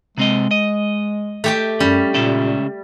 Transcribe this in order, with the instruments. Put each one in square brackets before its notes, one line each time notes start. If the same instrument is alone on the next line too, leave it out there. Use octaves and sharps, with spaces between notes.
[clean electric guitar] C3 C4 D#5 [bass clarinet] G#3
[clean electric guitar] D#5
[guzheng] A3 G4 G5
[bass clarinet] F#2 [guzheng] G3 [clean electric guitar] C#4
[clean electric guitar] C#2 C#4 E5 [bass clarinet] A#2